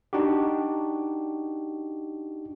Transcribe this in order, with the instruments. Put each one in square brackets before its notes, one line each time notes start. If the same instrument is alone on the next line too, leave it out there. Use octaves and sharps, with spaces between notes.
[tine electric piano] D4 D#4 F#4 G4